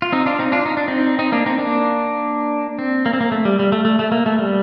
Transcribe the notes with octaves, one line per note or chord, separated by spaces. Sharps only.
F4
C4 D#4
D4 F4
C4 D#4
D4 F4
D#4
D4
C4 D#4
C4 D#4
A#3 D4
C4 D#4
A#3 D4
C4
A#3
C4
A#3
A3
G3
G3
A3
A3
A3
A#3
A3
G3